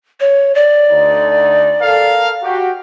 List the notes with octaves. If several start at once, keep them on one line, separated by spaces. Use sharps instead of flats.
C#5
D5
D2 D3 D#4
A4 A#4 F5
F#4 G4